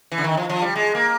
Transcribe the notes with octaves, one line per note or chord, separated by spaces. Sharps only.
E3
D3
D#3
F3
F3
G3
G#3
A#3